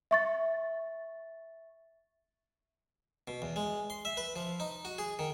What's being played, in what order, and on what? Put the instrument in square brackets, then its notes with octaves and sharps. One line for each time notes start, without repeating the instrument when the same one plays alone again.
[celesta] E5 C#6 A6
[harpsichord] B2
E2
G#3
C6
E5
B4
F3
D#4
F#4
G#4
D#3